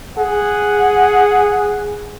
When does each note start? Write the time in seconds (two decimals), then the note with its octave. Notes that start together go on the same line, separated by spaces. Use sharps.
0.18 G#4 F#5